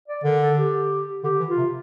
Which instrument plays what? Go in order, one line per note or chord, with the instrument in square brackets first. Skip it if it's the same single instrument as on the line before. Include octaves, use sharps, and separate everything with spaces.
[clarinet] D5
[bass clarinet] D3 [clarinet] A#4
[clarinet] A4
G4
[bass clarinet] D3 [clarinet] G4
[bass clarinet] E3
[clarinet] F4
[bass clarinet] C3